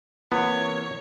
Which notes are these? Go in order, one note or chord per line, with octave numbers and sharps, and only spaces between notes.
C3 E3 A#3 B3 E4 C#5